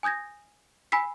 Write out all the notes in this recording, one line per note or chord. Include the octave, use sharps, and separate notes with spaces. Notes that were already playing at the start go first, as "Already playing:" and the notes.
G#5 D#6 G6 G#6 A#6
G#5 B5 E6 B6 C7